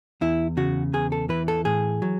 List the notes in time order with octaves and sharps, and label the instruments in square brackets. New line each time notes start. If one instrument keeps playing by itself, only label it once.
[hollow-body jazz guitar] E2 E4
C#3 F#4
E2 G#4
A4
E3 B4
A4
A2 G#4
F#3